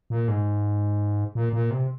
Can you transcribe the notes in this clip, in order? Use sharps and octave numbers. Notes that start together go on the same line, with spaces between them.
A#2
G#2
A#2
A#2
C3